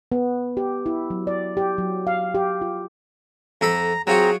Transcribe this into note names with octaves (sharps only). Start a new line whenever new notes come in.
B3
G4
E4
F#3
D5
G4
F#3
F5
G4
F4
F2 A4 A#5 B5
F#3 C4 F4 F#4 G#4 A#5